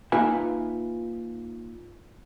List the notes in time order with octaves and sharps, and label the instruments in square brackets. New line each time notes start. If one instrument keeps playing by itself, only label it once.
[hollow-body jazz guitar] A#3 D#4 F4 B4 E5 G#5